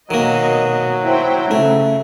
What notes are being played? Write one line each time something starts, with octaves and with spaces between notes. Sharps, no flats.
B2 D#3 F#3 A#3 D#5
E4 C5 G5
C#3 A3